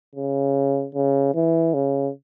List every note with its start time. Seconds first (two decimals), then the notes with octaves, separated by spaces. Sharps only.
0.15 C#3
0.95 C#3
1.35 E3
1.74 C#3